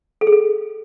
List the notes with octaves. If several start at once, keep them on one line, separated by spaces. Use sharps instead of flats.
A4
G#4
A4